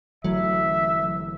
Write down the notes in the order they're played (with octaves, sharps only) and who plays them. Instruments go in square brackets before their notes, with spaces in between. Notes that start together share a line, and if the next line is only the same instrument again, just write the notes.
[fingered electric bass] G1 E3 A3 [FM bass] F#3 [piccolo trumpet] E5